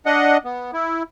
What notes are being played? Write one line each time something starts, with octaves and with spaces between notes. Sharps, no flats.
D4 D#5 F#5
B3
E4